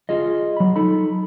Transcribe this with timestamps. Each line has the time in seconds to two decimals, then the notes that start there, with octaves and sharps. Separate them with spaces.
0.09 F4 G#4 D#5
0.57 F#3 B5
0.76 D#4 A4 B5